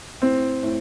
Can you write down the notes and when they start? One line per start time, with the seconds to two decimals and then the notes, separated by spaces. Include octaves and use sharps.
0.22 A2 C4
0.63 A2